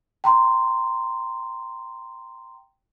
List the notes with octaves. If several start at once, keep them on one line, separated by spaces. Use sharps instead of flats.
G5 A#5 C6